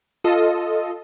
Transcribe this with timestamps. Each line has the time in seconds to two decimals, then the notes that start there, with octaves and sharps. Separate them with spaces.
0.24 F4 A4 D#5